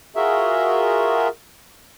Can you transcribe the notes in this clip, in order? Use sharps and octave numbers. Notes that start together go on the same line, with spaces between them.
F4 F#4 G#4 A#4 E5